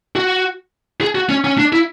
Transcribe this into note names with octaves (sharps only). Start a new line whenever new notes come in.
F#4
G#4
F#4
C#4
C#4
D4
E4